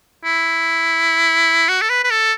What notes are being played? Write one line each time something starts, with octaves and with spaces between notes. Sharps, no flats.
E4
F#4
A4
B4
B4
A4